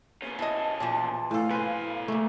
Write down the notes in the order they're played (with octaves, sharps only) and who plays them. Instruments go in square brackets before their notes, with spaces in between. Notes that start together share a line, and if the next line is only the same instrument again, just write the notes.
[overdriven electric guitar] B2 C#4 [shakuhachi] A#3
[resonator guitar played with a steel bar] E4 D#5 [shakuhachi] A5
[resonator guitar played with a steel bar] A#2 E3 F3
[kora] A2 A4 [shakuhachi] F5
[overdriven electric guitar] B2 G#5 [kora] B4 C5
[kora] A3 A#3